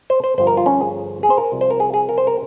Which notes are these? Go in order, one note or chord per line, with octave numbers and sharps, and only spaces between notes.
C5
C5
G1 G2 F3 C5
A#4
F4
C#4
G#4
G#4
C5
A#4
C2 C3 F3
C5
A#4
G#4
G#4
A#4
C5
A#4